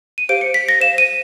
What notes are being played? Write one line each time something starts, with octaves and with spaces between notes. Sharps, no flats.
D#7
G4 C5 F5 D7
C#7
B6
A#6
C5 F5 E7
D#7